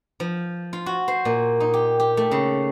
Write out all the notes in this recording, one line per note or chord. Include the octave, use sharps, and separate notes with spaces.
F3
F4
F#4
C5
A#2
D#4
G4
G4
A3
C#3